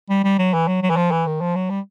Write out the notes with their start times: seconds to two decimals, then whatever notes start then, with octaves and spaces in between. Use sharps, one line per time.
0.09 G3
0.24 G3
0.39 F#3
0.53 E3
0.67 F#3
0.82 F#3
0.90 E3
0.96 F3
1.11 E3
1.26 D#3
1.41 F3
1.55 F#3
1.70 G3